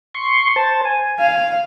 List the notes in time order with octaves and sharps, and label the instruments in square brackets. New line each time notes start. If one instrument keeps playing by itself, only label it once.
[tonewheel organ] C6 C#6
C5 A5
G#5
[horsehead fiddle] F5